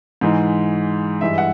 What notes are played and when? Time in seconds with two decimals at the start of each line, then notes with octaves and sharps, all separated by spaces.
0.21 G#2 E3 G#3
1.21 G2 E3 G#3 E5
1.38 F#5